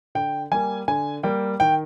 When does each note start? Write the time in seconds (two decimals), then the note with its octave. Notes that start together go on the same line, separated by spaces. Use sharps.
0.15 D3 G5
0.51 G3 A#3 G#5
0.88 D3 G#5
1.23 G3 A#3 G5
1.60 D#3 G5